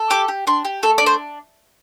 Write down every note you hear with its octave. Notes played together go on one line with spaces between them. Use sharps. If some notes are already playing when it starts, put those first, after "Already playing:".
Already playing: A4
G4 D6
G4
D4 C6
G4
A3 A4
D4 D5
C5